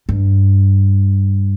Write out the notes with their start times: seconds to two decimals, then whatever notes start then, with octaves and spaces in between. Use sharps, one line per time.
0.09 G2